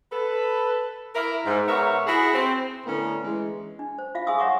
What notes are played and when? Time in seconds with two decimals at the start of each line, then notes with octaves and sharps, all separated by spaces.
0.12 A4 B4
1.15 E4 A#4
1.45 G#2
1.68 G#2 B3 A#4 C#5 E5
2.07 E4 F#4 G#4
2.34 C4
2.86 A2 D3 A3 B3 C#4 A#4
3.24 E3 G#3
3.79 D4
3.98 C5
4.15 F4 E5 F5
4.27 G#4 F5 G#5 C6 D#6 E6
4.39 C#5 E5 F#5 A#5 C#6 D6